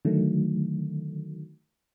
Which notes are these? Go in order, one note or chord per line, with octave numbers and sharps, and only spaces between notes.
D3 D#3 F#3 A3